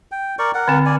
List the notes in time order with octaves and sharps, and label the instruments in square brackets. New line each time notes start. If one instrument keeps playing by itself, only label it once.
[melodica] G5
A#4 D5 C#6
A#4 F#5
[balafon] D3 C4
[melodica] D5 G#5